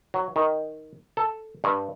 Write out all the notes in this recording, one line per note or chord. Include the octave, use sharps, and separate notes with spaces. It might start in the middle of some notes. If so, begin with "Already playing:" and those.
F#3
D#3
A4
G2